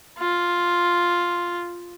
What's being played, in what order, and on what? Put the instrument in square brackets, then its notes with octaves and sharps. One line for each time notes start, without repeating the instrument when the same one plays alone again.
[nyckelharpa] F4